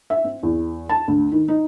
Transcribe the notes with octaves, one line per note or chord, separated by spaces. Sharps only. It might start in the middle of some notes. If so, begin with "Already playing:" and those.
E5
C4
E2
A5
D2
D#3
D#4